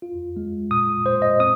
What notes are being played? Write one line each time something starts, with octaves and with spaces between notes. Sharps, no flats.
F4
G#3
A#2 D#6
A#2 C5
D#5
C4 D#6